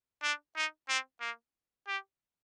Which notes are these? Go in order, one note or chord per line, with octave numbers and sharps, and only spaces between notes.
D4
D#4
C4
A#3
G4